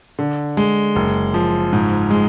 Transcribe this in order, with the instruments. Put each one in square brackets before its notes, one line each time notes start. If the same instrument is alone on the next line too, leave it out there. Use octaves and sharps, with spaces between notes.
[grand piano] D3
G#3
F#1
F3
G#2
G#3